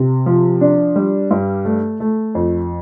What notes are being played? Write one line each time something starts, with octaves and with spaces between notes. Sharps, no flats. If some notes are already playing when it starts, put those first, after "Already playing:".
Already playing: C3
F3
D4
G3
G2
A3
A3
F2